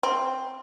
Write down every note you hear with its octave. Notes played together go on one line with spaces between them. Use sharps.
C4